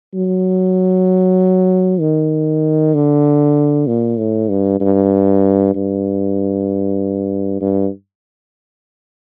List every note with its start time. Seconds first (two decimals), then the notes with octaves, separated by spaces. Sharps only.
0.14 F#3
2.00 D#3
2.94 D3
3.87 A#2
4.19 A2
4.50 G2
4.80 G2
5.75 G2
7.61 G2